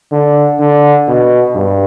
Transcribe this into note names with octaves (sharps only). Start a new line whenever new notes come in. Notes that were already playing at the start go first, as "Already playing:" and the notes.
D3
D3
B2
G2